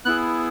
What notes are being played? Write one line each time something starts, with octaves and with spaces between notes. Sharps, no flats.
B3 E4 G#4 F#6